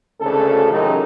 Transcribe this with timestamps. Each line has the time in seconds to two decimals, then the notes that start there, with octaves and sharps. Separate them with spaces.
0.21 G#1 D2 C#3 A4
0.72 F#2 C#3 E3 D#4 G4 A#4